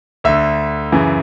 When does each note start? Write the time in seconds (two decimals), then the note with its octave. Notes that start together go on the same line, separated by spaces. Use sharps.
0.24 D2 D3 E5
0.92 F#2 C#3 E3